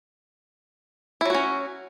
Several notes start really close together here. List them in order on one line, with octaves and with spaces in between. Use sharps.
E4 F#3 F#4 C#4